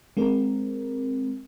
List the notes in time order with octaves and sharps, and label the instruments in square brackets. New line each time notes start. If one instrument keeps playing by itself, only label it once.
[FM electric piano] G#3 C4 A#4